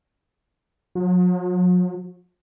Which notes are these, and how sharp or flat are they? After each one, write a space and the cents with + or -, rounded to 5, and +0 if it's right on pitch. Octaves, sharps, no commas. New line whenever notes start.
F#3 -45